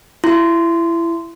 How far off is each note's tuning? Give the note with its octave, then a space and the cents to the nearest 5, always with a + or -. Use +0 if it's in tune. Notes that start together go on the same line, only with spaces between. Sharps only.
E4 +25 C6 -15